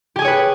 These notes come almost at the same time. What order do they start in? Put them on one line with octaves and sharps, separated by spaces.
G4 G#5 G#4 C#5 B4